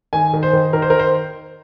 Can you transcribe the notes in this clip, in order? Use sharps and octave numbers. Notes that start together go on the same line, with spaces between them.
D#3 G#5
D#3
C5
D#3
D#3 A#4
C5
A#4
C5